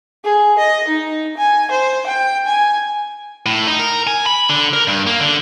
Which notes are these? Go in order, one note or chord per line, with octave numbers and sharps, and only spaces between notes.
G#4
D#5
D#4
G#5
C5
G5
G#5
A2
D#4
A#4
G#5
B5
D3
A#4
G2
A#3
D3